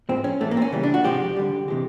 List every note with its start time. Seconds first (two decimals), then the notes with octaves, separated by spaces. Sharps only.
0.09 A2 F3 G#3 C4
0.24 C#4
0.41 A2 E3 G#3 A3
0.51 A#3
0.57 C4
0.62 C#4
0.72 C#3 E3 G3
0.83 D4
0.94 F#4
1.04 C3 F3 G#3 G4
1.36 D3 G3
1.68 C3 E3 G#3